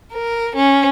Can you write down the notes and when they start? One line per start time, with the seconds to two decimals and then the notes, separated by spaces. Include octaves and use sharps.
0.13 A#4
0.55 C#4